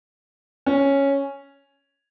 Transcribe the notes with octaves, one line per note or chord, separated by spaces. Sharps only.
C#4